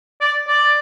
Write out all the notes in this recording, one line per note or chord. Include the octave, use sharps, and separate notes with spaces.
D5
D5